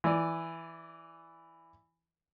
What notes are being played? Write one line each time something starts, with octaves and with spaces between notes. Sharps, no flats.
E3 D5